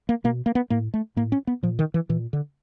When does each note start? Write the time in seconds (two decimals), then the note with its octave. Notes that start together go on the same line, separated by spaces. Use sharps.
0.09 A#3
0.24 B2 A#3
0.46 A#3
0.55 B3
0.70 A2 A#3
0.94 A3
1.16 A2 A#3
1.32 C#4
1.47 B3
1.63 A#2 F3
1.79 D#3
1.94 E3
2.09 A#2 E3
2.33 D3